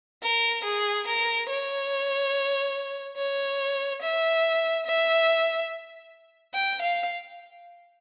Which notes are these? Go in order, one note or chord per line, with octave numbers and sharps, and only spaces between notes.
A#4
G#4
A#4
C#5
C#5
E5
E5
G5
F5